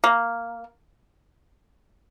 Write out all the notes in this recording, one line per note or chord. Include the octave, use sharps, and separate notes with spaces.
A#3